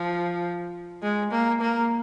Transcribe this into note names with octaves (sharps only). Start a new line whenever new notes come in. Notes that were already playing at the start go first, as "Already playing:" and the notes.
Already playing: F3
G#3
A#3
A#3